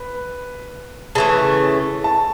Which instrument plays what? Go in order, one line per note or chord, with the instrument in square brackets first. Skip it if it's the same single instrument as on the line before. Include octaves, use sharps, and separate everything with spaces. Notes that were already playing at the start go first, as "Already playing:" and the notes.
Already playing: [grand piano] B4
[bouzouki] C#3 E3 A3 [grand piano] A5
[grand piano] A5